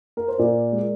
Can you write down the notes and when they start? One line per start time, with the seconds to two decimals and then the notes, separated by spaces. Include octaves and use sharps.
0.17 A#4
0.28 C5
0.38 A#2 A#4 D5
0.72 G#3